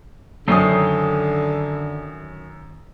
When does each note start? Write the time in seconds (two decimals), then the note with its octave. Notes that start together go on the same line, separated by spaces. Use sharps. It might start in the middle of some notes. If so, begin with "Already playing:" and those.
0.48 F#2 D3 D#3 C#4 C5 D#6